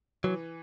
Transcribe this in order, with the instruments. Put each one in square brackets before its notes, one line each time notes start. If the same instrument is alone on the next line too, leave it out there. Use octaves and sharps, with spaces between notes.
[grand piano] E3 [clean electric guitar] F#3